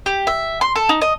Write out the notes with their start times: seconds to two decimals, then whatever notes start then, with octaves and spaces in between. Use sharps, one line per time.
0.06 G4
0.27 E5
0.61 C6
0.75 A4
0.89 D#4
1.01 D#5